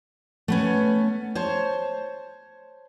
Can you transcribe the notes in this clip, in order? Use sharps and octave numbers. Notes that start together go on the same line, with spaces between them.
A3 B3 C#4
C5 C#5 A5